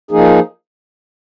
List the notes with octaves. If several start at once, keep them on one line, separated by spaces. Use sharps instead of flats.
F3 A#3 D#4 G#4